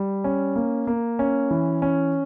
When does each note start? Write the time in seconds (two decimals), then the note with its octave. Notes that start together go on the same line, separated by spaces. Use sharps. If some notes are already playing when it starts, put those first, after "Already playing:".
Already playing: G3
0.24 C#4
0.56 A#3
0.87 A#3
1.19 C#4
1.51 E3
1.82 C#4